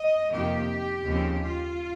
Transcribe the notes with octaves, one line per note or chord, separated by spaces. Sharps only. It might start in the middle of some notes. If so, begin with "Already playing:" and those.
Already playing: D#5
F2 C3 D#3 A#3 G4
D#2 C#3 F3 C4
F4